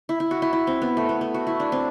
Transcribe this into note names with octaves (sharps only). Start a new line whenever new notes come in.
E4
E4
F#4
E4
E4
C4
B3
A3
B3
A3
F#4
E4
D4
C4